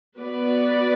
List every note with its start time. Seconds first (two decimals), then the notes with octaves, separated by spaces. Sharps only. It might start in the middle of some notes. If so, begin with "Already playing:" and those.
0.18 B3 F#4 B4 D5